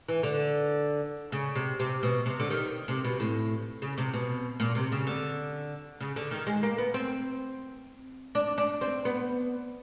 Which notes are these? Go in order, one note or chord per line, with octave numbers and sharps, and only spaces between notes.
E3
D3
C#3
C3
C3
B2
C3
D3
D#3
C3
B2
A2
C#3
C3
B2
A#2
C3
C#3
D3
C#3
D3
D#3
G#3
A#3
B3
C4
D4
D4
C4
B3